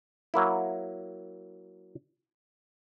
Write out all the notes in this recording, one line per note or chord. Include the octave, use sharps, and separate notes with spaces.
F#3 A#3 E4